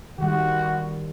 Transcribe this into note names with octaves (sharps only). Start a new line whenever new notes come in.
D#3 G3 F#4